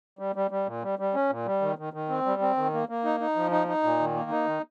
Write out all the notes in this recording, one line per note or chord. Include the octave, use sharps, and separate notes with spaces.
G3
G3
G3
A#2
G3
G3
C#4
A#2
G3
D#3
D#3
D#3
C4
G3
C4
D#3
A#3
A#3
D#4
D#4
F3
D#4
D#4
A#2
D#3
A#3
D#4
D#3